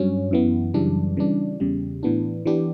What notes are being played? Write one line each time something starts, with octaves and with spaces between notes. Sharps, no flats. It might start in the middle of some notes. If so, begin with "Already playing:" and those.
Already playing: G2 F#3 C#4
F#2 E3 B3
F#2 C#3 E3 G3 D4
C#3 E3 G3 D4
E2 C#3 G3
A2 E3 B3 D4
E3 B3 D4 G4